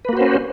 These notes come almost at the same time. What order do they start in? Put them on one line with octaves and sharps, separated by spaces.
B4 A#3 F#4 C5 C#4